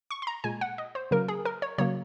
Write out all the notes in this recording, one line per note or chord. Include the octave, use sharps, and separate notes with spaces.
C#6
C6
A#5
A#2 G#3 G#5
F#5
D#5
C5
C#3 F#3 A#3 A#4
G#4
A#4
C#5
C#3 F#3 A#3 C#5